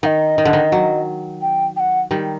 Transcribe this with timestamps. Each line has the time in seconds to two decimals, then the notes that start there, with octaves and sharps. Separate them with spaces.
0.03 D#3 D#5 F#5
0.38 D#3
0.45 D3
0.53 D#3
0.72 F#3
1.42 G5
1.76 G5
1.80 F#5
2.11 D#3 G3